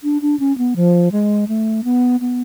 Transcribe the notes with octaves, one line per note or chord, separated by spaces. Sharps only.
D4
D4
C#4
B3
F3
G#3
A3
B3
B3